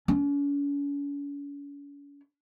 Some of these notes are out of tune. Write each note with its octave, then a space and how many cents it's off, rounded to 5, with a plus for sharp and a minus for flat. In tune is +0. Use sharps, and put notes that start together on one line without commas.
C#4 +45